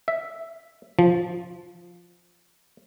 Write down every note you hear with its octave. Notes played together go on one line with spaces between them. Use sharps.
E5
F3